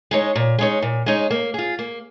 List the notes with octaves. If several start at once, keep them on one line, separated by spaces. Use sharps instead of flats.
G#3 D#4 C#5
A#2
G#3 D#4 C#5
A#2
G#3 D#4 C#5
A#3
F4 G#4
A#3